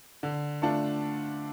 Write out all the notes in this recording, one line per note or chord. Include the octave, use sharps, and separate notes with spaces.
D3
A3 D4 F4